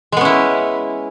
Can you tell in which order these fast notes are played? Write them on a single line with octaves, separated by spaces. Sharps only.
G#3 B3 C#4 E4